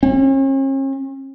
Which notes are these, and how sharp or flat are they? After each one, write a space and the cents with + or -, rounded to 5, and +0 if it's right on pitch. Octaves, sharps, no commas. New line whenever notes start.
C#4 -45